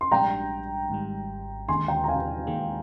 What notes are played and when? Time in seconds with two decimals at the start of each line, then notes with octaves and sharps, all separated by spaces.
0.01 C6
0.12 A#1 G#2 G3 D4 G5 A#5
0.90 G#1 G#2 G3
1.68 D#2 D3 G#3 G#5 C6
1.88 G5 A#5
2.04 A#5
2.08 F5 G#5
2.47 D#2 D#3 G#3